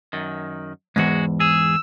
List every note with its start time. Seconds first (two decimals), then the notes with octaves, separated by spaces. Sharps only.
0.13 F#2 D#3
0.96 E2 G#2 G#3 F#4
1.40 G#4 E6